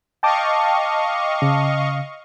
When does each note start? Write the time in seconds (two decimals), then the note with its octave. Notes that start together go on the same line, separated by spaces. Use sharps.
0.23 D#5 F5 G5 A5 C#6 D6
1.42 C#3